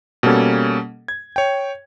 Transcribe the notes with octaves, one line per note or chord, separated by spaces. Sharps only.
B2 G3 A#3 C#4 A4
G#6
C#5 G5